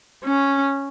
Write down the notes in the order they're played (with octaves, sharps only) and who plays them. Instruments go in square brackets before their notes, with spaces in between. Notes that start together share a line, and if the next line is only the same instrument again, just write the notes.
[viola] C#4